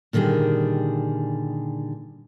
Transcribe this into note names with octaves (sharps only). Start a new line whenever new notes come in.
A#2 D3 D#3 G3 G#4